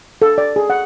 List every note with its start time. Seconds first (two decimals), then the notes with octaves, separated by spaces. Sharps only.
0.22 A4
0.38 D5
0.56 G#4
0.70 F#5